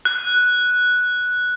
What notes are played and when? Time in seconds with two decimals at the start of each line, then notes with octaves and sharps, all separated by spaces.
0.05 F#6